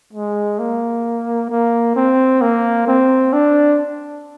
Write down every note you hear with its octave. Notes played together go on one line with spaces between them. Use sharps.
G#3
A#3
A#3
C4
A#3
C4
D4